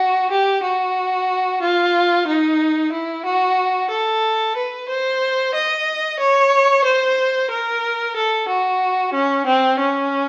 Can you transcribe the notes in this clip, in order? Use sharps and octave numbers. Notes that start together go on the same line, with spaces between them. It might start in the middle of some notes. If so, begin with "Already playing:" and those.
Already playing: F#4
G4
F#4
F4
D#4
E4
F#4
A4
B4
C5
D#5
C#5
C5
A#4
A4
F#4
C#4
C4
C#4